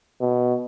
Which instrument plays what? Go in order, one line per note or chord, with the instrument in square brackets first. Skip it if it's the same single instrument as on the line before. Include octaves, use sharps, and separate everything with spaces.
[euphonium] B2